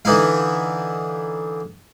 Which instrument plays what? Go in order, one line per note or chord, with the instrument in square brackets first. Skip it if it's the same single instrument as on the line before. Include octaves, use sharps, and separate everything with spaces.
[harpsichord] D3 E3 D#4 E4 F5